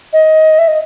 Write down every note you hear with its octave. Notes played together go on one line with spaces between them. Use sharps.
D#5
E5
D#5